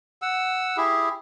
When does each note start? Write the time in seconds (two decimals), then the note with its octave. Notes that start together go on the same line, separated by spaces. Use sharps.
0.22 F#5 E6
0.77 E4 G4 G#4